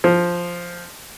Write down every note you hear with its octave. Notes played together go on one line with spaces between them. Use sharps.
F3